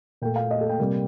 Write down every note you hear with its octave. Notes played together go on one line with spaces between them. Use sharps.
A#2 A3 G5
F5
D#5
A4
G5
C3 G3 A#3